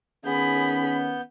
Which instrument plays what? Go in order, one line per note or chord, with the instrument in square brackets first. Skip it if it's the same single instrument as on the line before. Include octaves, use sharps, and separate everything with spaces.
[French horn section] D#3 C#4 [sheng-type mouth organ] B3 G6 [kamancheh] G#4 B5